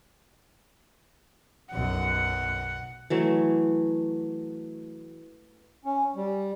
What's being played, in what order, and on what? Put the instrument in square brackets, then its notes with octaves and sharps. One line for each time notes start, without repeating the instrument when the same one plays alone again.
[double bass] B1 F#2 [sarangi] F#5
[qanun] E3 F#3 A3
[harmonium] C#4
G3